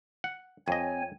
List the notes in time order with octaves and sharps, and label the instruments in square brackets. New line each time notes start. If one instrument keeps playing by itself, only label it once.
[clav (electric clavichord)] F#5
[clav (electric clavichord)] F2 D#5 [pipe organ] C4 C#5 G#5